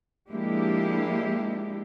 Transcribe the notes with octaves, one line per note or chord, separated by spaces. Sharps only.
F3 G#3 A#3 D4 E4 G4